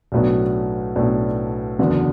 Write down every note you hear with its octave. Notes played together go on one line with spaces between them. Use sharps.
B1 A2 F#3 B3 D4
B1 A2 F#3 B3 D4
F#1 E2 D3 F#3 B3